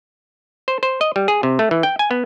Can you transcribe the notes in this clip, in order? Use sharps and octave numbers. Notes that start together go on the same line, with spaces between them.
C5
C5
D#5
G3
G#4
C3
A3
E3
G5
G#5
B3